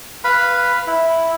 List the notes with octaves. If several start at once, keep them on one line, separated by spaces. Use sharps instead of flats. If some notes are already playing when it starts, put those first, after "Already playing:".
B4 F5 B5
E4